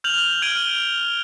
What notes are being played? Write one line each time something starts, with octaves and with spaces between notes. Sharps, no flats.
F6 G6 F7 F#7
F6 G#6 D7 D#7 F#7 G7